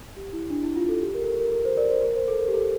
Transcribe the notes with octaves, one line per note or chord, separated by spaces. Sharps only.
G4
E4
D4
E4
F4
A4
G4
A#4
A4
A#4
A#4
A#4
C5
A#4 D5
C5
A#4
C5
A4
A#4
G4
A4